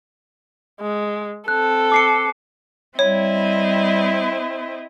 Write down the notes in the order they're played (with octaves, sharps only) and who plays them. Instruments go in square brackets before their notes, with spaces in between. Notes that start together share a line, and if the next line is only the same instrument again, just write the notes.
[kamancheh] G#3
[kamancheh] C4 A4 [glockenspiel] F#6
[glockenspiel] D6 C7 C#7
[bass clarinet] G3 [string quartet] C4 E4 D#5 [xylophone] C#5